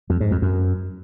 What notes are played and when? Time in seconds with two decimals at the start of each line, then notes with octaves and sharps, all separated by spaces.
0.10 F2
0.20 G#2
0.31 F2
0.42 F#2